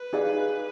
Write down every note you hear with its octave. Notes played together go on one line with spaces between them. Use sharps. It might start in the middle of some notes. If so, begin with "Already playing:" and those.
Already playing: B4
D#4 G#4 D5 F5